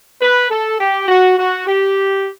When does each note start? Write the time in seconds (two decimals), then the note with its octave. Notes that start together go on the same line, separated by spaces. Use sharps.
0.20 B4
0.50 A4
0.79 G4
1.08 F#4
1.38 F#4
1.67 G4